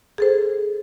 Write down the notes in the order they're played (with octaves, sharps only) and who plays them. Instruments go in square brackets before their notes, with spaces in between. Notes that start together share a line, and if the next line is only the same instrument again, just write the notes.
[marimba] G#4 A4 C5